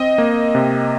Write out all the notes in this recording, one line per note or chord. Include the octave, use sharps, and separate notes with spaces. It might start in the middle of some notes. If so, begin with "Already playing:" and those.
Already playing: C4 D#5
A#3
C3